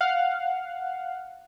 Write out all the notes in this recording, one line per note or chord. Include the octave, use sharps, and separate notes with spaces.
F5 F#5